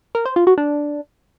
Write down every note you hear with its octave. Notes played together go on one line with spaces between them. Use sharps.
A#4
C5
F4
F#4
D4